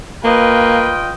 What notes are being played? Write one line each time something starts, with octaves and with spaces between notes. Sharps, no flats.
A#3 F4 B4 D#5 G5